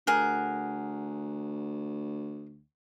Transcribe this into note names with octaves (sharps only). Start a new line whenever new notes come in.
D2 G#4 A#4 F#5